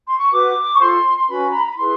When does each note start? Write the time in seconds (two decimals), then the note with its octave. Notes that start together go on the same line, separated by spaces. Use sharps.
0.08 C6
0.20 C#6
0.32 F#4 B4 D6
0.74 C#6
0.79 F4 A4 C5 C6
1.17 C6
1.28 C#4 F#4 B4 B5
1.50 A#5
1.63 B5
1.77 E4 G#4 B4 C6